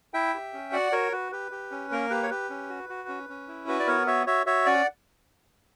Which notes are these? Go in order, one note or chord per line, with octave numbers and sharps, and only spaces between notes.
E4 E5 G5
G4
C#4
F#4 D5 F#5
F#4 A#4 C#5
F#4 B4
G4 B4
G4
C#4
A#3 A#4
G4 B4
C#5
G4 B4
C#4
F#4
F#4
C#4
C#4
E4
F#4 B4
D5
B3 A#4 C#5
F#4 C#5 E5
F#4 C#5 E5
F#4 C#5 E5
C#4 D5 F#5